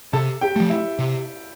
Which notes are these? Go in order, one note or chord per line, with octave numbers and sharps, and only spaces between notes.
C3 A4 A5
G4 G5
F3 A3
E4 E5
C3